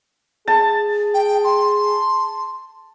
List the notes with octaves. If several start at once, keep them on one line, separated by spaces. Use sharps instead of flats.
G#4 A5
G5
C6